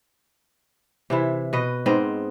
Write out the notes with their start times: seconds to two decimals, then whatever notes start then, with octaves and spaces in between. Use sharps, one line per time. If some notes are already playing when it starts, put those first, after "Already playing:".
1.10 C3 E3 E4
1.53 B2 B4 D#5
1.86 G#2 B3 C4 D#5